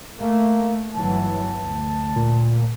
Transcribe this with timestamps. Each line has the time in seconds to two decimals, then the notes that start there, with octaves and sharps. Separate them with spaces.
0.19 A3 A#3
0.95 G1 E3 F#3 A5
1.61 D2
2.16 A#2